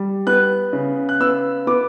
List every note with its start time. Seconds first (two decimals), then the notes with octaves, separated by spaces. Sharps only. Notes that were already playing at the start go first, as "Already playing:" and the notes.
Already playing: G3
0.27 B3 F#6
0.73 C#3
1.09 F#6
1.21 B3 E6
1.67 B3 D6